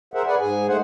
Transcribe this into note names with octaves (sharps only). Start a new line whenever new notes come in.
G#4 A#4 C5 E5 F#5
G#4 B4 D5 F#5 G#5
G#2 G#4 G#5
G#3 A3 G#4 C5 F#5